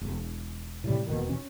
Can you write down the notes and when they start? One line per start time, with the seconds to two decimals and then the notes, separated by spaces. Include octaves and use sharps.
0.01 E1
0.84 A2 C3 G3
1.07 E1 D#2 B2 D#3
1.29 C#4